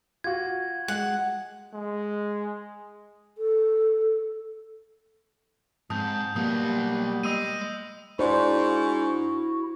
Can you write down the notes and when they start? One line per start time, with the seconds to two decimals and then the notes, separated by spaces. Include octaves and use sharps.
0.24 F4 F#4 G#6
0.88 G#3 F#5
1.74 G#3
3.38 A4
5.90 G#2 C4 A5 D#6 G6
6.36 B2 F#3 G3 A#3 D#6
7.23 G#3 D#5 D#6 E6 D#7
8.19 G#2 D4 E4 F#4 C5